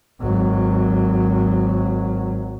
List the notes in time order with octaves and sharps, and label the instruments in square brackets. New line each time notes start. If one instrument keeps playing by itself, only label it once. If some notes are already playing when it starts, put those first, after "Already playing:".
[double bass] G#1 F#3